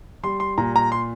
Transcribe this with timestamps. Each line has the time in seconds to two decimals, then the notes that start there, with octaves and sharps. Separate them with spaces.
0.23 G3 C6
0.40 C6
0.58 A#2 A#5
0.76 A#5
0.92 C6